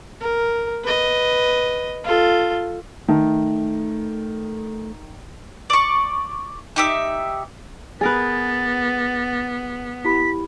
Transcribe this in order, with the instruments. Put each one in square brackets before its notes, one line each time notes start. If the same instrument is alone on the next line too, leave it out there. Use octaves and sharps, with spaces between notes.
[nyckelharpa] A#4
B4 D#5
F4 A4
[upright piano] D#3 [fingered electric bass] A3
[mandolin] D5 C#6
D#4 G4 E5
[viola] B3 [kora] G#4 A#4 B4 [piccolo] A6
[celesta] E4 G4 B5 [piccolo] B6